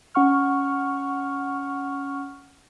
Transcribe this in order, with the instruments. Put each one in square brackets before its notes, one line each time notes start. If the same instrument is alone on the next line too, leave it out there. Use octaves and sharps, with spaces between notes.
[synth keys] C#4 F#5 C#6 F6